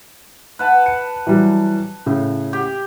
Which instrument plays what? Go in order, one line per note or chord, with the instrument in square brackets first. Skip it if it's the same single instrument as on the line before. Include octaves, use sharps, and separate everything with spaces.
[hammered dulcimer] B4 F#5 A5
[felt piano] C#7
E3 F#3 G3
A2 C#3
[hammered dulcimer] G4